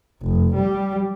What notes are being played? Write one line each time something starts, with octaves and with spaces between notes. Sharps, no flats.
F1
G3